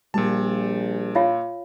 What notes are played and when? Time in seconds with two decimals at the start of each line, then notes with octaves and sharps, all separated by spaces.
0.14 A#1 A#2 G3 G4 A5
1.15 F4 C#5 F5